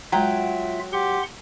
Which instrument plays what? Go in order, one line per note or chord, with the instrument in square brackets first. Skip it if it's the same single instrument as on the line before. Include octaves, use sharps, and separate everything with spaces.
[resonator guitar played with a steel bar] F#3 G5 [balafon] G#3 A#5 [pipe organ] F4 E5
[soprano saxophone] G4 [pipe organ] F#5 C6